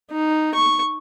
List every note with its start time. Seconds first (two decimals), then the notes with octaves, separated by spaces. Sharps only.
0.12 D#4
0.55 C#6